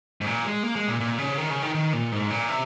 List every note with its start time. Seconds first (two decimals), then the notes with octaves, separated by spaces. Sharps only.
0.21 G#2
0.26 A#2
0.45 G#3
0.63 A#3
0.76 G#3
0.88 A#2
1.00 A#2
1.19 C#3
1.38 D#3
1.50 C#3
1.62 D#3
1.75 D#3
1.93 A#2
2.12 G#2
2.30 A#2
2.49 C3